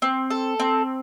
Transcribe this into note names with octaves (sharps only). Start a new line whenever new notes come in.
C4
A4
C4